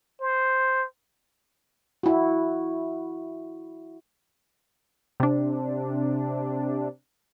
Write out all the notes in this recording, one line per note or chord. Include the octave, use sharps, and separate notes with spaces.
C5
E4 F#4
C3 D4